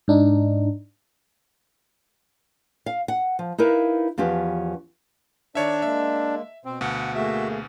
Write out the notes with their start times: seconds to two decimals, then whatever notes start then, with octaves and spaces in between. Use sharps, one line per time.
0.08 G#2 D4 D#4
2.86 F5
3.08 F#5
3.39 F3
3.58 D#4 E4 A#4 B4 F5
4.18 E2 F3 C#4 G4 B4
5.55 D#3 D4 C#5 D5 E5
5.82 G#3 A#3 E5
6.65 B2 C4 C5
6.81 D2 B2 F5 F#5
7.15 A3 A#3 F#4 G#4 E5